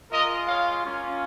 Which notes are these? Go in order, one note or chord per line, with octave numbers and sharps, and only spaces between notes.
G#3 F4 A#4 D#5
C#5 F5
A#3 C#4 F4